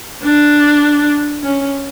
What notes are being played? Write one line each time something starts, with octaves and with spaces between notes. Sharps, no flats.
D4
C#4